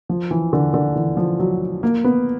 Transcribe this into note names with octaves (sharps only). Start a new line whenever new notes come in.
F3
E3
D3
D3
E3
F3
F#3
A#3
B3